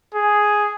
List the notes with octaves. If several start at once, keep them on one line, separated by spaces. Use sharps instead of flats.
G#4